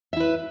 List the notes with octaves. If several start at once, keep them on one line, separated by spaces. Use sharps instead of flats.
E4 B4 E5